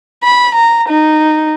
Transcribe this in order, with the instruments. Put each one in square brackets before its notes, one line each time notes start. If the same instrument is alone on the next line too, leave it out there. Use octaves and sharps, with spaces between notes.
[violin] B5
A#5
D#4